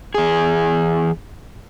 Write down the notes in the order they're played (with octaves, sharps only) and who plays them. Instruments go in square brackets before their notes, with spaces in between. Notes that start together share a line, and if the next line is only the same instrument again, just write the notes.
[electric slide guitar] E2 G#4